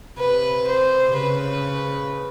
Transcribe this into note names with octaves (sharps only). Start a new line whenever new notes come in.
C3 B4
C5
C#3 B4